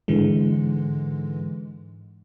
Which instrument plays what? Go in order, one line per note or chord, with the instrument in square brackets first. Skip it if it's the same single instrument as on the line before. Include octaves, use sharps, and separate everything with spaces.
[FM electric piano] G#2 D3 E3 G#3